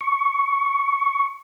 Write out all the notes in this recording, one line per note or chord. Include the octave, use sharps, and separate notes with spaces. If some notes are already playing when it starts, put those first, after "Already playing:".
C#6